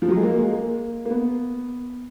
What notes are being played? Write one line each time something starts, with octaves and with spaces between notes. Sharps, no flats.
F3
F#3
G#3
A#3
G#3
A#3
A#3
B3